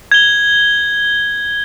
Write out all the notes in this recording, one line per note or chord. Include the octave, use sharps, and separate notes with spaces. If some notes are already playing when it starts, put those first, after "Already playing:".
G#6 G7